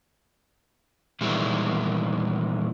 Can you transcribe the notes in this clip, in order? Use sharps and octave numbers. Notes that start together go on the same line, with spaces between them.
E2 A#2 D#3 G3 G#3 E4